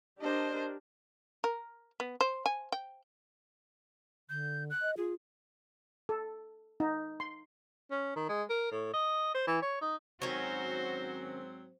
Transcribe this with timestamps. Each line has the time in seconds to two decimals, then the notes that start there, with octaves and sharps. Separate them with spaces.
0.21 D4 G4 A#4 C5 D#5
1.44 A#4
2.00 B3
2.21 C5
2.46 G#5
2.72 G5
4.29 D3 G6
4.70 F#6
4.82 D#5
4.97 F4 G#4
6.09 A4
6.80 D#4
7.20 C6
7.91 C#4
8.16 D#3
8.29 G#3
8.50 A#4
8.71 A2
8.94 D#5
9.34 C5
9.47 E3
9.62 C#5
9.81 D#4
10.22 G#2 D#3 F#3 C4 C#4 F#4 C5 C#5